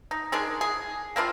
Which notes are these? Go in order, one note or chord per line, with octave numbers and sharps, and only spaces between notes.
D#4
D#3 G#3 D4 G#4
G#4
A#3 C4 D4 F4